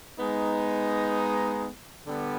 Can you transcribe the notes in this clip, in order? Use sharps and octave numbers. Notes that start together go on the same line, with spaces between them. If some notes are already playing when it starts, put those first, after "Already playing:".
G#3 B3 D#4
D3 G3 B3